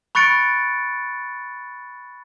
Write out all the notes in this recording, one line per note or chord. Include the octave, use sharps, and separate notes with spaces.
B5 C#6 F#6 A6 C#7 D7